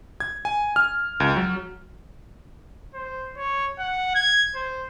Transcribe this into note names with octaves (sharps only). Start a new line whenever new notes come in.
G#6
G#5
F6
C#2
F#3
C5
C#5
F#5
G#6
C5